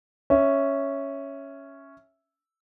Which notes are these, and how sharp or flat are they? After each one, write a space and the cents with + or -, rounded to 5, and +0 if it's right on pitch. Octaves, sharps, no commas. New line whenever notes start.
C#4 +0 E5 +0